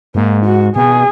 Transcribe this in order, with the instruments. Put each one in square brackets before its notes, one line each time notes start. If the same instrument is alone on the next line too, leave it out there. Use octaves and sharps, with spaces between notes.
[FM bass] G#2 [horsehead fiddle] A#3
[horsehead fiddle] F#4
[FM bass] B2 [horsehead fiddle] G#4